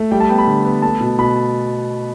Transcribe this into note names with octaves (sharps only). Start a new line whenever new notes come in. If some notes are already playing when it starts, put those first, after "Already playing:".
Already playing: A3
G3 G5
A5
B3 G5
B5
D3
B3
A3 A5
B2
B2 B5